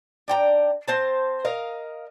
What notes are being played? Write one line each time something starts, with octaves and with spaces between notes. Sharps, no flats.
D4 G5 A#5
C4 C5 A5
A#4 D#5 F5